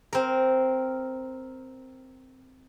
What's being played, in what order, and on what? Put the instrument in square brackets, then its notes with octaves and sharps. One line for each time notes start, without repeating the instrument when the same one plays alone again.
[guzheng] C4 A#4